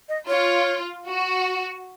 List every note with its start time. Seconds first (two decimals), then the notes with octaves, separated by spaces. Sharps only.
0.09 D#5
0.28 F4 C#5
1.08 F#4